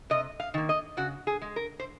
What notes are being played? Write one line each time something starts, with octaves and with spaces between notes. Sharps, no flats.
C3 D#5
F5
D#3 A#3
D#5
C#3 F#4
G#4
G#3
A#4
C5